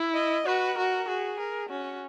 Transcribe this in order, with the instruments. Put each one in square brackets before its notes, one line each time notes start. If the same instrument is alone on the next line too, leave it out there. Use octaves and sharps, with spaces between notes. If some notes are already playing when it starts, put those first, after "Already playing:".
Already playing: [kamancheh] E4
[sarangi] D#5
[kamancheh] F#4 [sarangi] B4
[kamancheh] F#4 [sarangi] A#4
[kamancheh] F#4 [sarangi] G#4
[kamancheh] A#4
[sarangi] C#4 [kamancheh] F#4